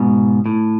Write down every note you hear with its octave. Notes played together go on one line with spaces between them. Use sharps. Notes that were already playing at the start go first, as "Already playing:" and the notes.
Already playing: G#2 B2
A2